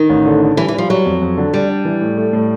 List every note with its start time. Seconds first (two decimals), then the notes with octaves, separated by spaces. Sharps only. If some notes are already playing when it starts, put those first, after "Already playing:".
Already playing: D#3
0.10 A1
0.26 D3
0.41 D3
0.57 E3 G3
0.68 E3
0.74 F3 G3
0.90 F#3 G3
1.05 F2
1.22 F2
1.37 D3
1.54 G3 D4
1.69 D4
1.85 E3
2.01 A2
2.17 A3
2.33 A2